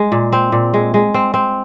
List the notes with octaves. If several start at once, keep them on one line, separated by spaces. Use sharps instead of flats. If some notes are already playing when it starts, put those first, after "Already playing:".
Already playing: G#3
A#2
C4
A#2
G#3
G#3
C4
C4